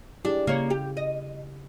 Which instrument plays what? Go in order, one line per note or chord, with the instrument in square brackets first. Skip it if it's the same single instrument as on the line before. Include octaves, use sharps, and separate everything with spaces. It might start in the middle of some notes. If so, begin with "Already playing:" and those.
[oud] D4 [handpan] E4 G4 G#4
[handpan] C#3 [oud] A#3 C#5
[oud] G4
D#5